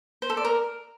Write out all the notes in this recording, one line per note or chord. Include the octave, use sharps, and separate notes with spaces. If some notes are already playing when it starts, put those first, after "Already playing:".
C5
A4
D5
A#4